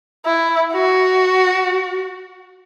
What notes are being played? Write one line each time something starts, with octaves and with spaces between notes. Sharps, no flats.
E4
F#4